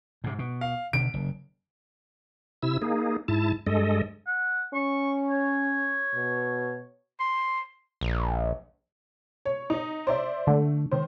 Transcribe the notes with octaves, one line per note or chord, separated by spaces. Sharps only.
G#2 C3
B2
F5
B2 D3 D#3 D7
F#1
C3 E4 E6
A#3 D#4 G#4
G#2 E4 A5
G2 G#3 A4 D#5
F#5
C#4 C#6
C#5
B2
C6
A#1
C#5
D#4 D#5
C5 D5 E5
D3 A3
D#3 C5